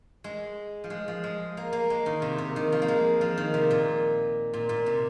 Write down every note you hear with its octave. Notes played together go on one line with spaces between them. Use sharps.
G#3
F3
G#3
F3
G#3
A#3
A#3
G#3
D#3
C3
C3
D#3
F3
A#3
G#3
F3
D#3
C3
A#2
A#2
A#2
C3